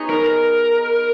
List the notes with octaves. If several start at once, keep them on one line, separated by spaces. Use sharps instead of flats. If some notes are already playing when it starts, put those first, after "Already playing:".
Already playing: B3 D#4 G#4 C#5
A#4
A#4